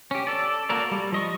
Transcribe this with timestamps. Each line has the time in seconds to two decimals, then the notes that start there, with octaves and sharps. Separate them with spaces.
0.11 C#4 G4
0.27 A4 D5
0.69 A#3 F#4 A4 A#4 D5
0.91 G3
1.12 F3 D#5 C#6